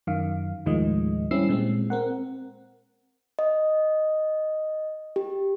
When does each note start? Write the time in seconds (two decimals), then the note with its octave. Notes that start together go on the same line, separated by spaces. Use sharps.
0.07 F#2 D#3 F5
0.66 D#2 A2 D#3 F3 G#3 D#5
1.31 G3 C4 C#4 E4 E6 C7
1.49 A#2 G#3 C4
1.90 C4 A#4 F#5
3.39 D#5
5.16 G4